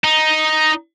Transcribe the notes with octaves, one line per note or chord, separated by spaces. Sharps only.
D#4